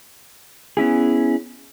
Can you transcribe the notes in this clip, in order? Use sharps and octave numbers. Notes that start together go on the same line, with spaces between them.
B3 C#4 E4 G#4